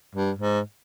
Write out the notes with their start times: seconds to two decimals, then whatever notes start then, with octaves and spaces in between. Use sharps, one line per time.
0.15 G2
0.38 G#2